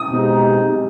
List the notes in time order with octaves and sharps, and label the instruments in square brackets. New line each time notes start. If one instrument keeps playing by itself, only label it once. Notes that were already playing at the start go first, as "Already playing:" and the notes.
Already playing: [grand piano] D#6
[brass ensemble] B2 G#3 C4 D#4 G4